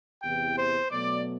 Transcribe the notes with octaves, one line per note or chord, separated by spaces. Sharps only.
E2 C3 E3 G5
C5
B2 F#3 A3 D5